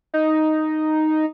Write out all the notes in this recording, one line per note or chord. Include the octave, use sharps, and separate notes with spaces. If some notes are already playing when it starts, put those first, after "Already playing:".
D#4